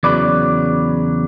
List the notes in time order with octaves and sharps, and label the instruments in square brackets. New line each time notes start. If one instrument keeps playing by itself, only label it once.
[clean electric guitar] E2 C#3 F#3 B4 D5